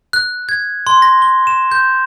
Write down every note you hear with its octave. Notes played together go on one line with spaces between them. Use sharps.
F#6
G#6
C6
A#6
G7
E7
G6